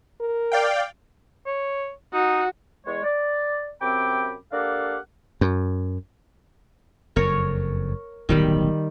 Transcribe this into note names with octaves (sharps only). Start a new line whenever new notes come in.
A#4
D5 F5 G5
C#5
D#4 F#4
E2 G#3 C#5
D5
F#2 C3 C4 G5 B5 D6
A#3 D4 G4 A4 F5 F#5
F#2
F#1 F2 A#4 C#5
D1 B1 D#3 G3 B5